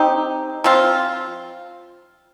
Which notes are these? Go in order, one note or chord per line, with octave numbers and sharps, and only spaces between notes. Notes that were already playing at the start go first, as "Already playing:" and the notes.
Already playing: C4 D#4 G4
F3 C4 F4